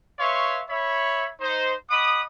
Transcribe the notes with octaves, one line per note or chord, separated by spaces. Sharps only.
B4 C#5 E5 F5 C6 C#6
C#5 E5 B5
D#4 C5
D#5 F#5 B5 D6 D#6